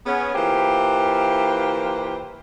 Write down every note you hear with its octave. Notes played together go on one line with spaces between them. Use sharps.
B3 C#4 G#4
E3 A#3 F4 G4 A#4 C5